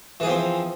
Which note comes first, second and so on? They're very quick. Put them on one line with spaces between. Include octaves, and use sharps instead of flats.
E3 G#4 F3 C4